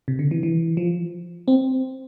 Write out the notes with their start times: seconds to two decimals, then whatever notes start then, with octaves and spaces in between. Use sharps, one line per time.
0.08 C3
0.19 D3
0.31 E3
0.43 E3
0.77 F3
1.48 C4